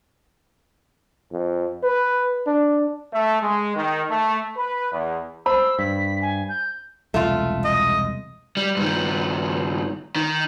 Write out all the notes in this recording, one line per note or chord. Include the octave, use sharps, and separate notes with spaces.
F2
B4
D4
A3
G#3
D#3
A3
B4
E2
C5 B5 E6
G2 B6
G#5
G6
E1 C2 A3 F4
D#5
G3
G2 D#3
D#3